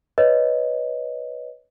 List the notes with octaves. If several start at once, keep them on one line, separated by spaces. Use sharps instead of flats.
B4 C#5 D#5